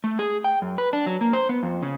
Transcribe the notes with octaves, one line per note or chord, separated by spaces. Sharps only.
A3
G#4
G5
F#2
B4
D4
F#3
A#3
C5
B3
F2
C#3